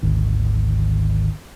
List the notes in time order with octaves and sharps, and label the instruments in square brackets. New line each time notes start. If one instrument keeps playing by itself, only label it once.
[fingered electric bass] G#1 D2 D#3